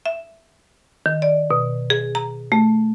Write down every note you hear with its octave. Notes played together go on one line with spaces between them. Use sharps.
E5
D#3
D5
B2
G#4
A#5
A3